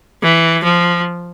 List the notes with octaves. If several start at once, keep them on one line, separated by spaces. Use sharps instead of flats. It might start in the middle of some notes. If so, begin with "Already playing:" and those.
E3
F3